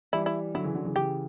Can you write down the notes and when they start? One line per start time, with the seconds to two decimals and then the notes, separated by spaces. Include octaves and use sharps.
0.13 E3 G3 E4
0.26 E4
0.54 D3 F#3 E4
0.64 C#3 E3
0.75 D3 F#3
0.85 C#3 E3
0.96 C#3 E3 G4